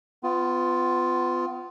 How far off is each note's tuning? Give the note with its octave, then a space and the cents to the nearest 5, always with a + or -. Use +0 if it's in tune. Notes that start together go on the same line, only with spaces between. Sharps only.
B3 +35 F4 +0